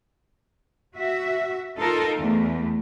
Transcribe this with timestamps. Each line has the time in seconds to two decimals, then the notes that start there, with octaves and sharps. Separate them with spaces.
0.96 F#4 E5
1.78 D#4 F4 A4 A#4
2.18 E2 A3